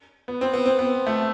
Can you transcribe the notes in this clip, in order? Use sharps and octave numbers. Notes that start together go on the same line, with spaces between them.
B3
C4
B3
C4
B3
A3